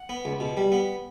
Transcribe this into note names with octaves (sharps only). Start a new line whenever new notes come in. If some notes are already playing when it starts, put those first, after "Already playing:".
Already playing: F#5
B3
C#2
B2
G3
B3